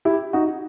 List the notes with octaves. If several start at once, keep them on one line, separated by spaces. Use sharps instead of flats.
E4 G4
D#4 F#4